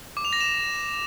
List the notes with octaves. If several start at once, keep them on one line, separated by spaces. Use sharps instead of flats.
D6
F7
A#6
E7